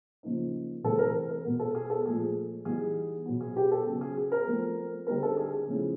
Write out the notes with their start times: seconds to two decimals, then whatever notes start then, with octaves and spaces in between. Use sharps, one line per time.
0.23 C#3 F3 A#3 D#4
0.84 C3 E3 A3 C4 A4
0.99 A#4
1.30 A#4
1.45 B2 G#3 B3
1.59 A4
1.75 G#4
1.90 A4
2.06 A#2 F3 A3 G#4
2.65 E3 G3 B3 D#4 G#4
3.26 B2 F#3 B3
3.41 G#4
3.57 G4
3.71 A4
3.87 C#3 F#3 B3
4.01 G#4
4.17 G#4
4.32 A#4
4.47 F3 A3 C4
5.07 D3 G3 C4 D#4 A#4
5.23 A4
5.37 G#4
5.53 G#4
5.68 C#3 F3 A3 C#4 E4